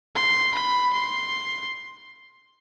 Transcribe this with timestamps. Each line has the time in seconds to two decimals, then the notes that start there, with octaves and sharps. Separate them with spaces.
0.15 C6
0.55 B5
0.94 C6